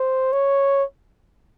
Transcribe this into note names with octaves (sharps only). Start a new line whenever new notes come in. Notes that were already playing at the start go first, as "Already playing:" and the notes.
Already playing: C5
C#5